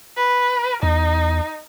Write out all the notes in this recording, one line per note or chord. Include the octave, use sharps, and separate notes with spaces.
B4
E2 D#4